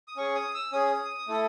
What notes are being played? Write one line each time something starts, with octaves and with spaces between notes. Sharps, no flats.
D#6
C#4 G#4 C#6
D#6
E6
C#4 G#4 D#6
A3 E4 A4